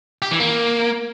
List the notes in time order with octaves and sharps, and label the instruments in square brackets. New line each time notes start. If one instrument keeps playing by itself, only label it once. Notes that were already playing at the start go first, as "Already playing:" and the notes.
[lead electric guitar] G4
E3
A#3